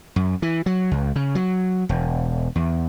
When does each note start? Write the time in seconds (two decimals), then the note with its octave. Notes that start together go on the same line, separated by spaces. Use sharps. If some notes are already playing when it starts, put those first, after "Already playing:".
0.16 F#2
0.42 E3
0.66 F#3
0.91 C#2
1.16 C#3
1.35 F#3
1.89 E1
2.56 E2